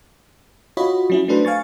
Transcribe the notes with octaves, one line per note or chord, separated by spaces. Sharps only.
F4 F#4 C#5 D#5 B5
F#3 C#4 E4
F#3 A3 D4 A4 B4 C5
F5 G#5 C#6 A6